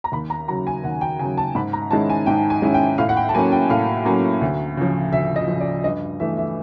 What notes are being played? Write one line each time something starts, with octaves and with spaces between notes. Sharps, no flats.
A#5
D#2 B5
A#5
C#3 F#3 A#5
G#5
D#2 F#5
G5
C#3 F#3 G#5
A5
G#2 B5
A#5
D#3 G#3 C#4 E4 A5
G#5
G#2 G5
G#5
D#3 G#3 C#4 E4
G5
A2 F5
F#5
G5
A5
F#3 A#3 C#4 G#5
G5
A2 F5
F#3 A#3 C#4
D2
C#3 F3
D2 E5
D#5
C#3 F3
D5
G2 D#5
E3 A3 E5
E5